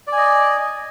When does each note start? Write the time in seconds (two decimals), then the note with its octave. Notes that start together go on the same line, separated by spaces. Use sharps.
0.07 D5
0.12 G#5
0.17 D#5